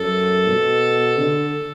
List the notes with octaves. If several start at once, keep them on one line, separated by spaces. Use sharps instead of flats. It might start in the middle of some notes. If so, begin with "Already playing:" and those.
Already playing: F#2 A4
B2
D3